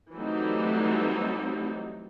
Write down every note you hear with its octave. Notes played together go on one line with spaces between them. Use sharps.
E3 F#3 G3 A3 C4 D#4